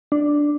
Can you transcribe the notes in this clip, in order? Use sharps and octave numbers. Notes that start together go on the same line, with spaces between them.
D4